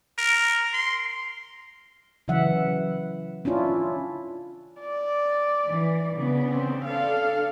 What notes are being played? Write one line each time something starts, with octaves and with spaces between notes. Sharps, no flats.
A#4
C6
C#3 E3 F#3 E5 F#5
C#4 D4 E4 F4
D5
E3
C#3 B3 D4
C4
D4 A4 F5